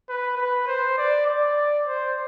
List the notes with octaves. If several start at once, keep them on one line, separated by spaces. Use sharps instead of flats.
B4
B4
C5
D5
D5
C5